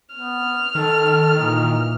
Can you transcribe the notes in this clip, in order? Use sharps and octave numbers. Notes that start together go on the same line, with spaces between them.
B3 F6
D#3 A4
A#2 E3 D#4